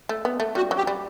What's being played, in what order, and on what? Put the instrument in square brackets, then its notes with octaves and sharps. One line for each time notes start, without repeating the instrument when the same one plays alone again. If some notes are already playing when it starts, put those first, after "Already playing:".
[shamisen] A3
B3
A3
[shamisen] G3 [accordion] F#4
[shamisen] F#3
[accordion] G4
[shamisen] G3